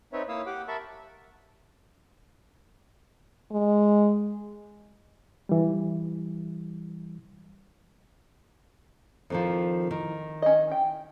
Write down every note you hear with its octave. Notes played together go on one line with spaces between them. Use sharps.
C4 D#4 B4 C#5 E5
A#3 E4 C#5 F5 D#6 E6
G4 F#5 D6
A#4 E5 A5 B5 C#6
G#3
E3 G3
F2 D#3 F3
D#3
C#4 D#5
G5